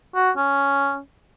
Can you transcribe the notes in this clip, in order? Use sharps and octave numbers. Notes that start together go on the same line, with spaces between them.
F#4
C#4